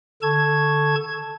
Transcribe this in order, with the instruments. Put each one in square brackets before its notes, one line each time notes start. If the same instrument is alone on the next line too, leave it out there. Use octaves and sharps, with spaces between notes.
[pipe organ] D3 A4 A5 C#6 G#6